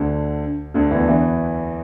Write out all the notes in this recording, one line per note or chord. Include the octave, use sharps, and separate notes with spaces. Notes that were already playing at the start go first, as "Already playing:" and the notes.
Already playing: D2 D3
D2 D3
E2 E3
E2 E3